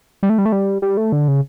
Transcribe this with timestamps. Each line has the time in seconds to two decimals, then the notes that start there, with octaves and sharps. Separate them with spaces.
0.23 G3
0.29 A3
0.38 G3
0.46 A3
0.52 G3
0.82 G3
0.97 A3
1.12 D3
1.28 C#3